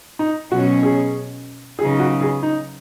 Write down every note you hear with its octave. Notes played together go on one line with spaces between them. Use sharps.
D#4
B2 F#3 C#4 F#4
G#4
C#3 F#3 B3 D#4 G#4
F#4
G#4
D#4